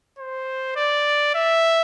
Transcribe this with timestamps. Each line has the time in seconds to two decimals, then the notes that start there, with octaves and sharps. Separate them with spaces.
0.19 C5
0.76 D5
1.35 E5